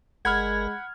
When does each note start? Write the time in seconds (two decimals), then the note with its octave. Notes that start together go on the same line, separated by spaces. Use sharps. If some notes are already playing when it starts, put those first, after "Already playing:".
0.25 G1 G#3 A#4 F#5 B5 F6 G#6